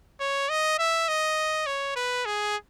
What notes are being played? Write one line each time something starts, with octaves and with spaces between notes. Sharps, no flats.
C#5
D#5
E5
D#5
C#5
B4
G#4